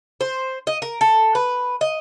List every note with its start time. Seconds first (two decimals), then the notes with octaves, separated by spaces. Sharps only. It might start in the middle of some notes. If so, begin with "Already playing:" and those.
0.21 C5
0.67 D#5
0.82 A#4
1.01 A4
1.35 B4
1.81 D#5